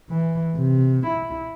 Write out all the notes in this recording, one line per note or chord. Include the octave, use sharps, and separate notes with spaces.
E3
C3
E4